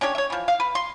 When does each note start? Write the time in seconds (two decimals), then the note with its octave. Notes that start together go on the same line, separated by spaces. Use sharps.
0.01 C#4 D4 G4 C#5
0.15 C#5 E5
0.30 E3 F3
0.48 F5
0.60 B4
0.75 C6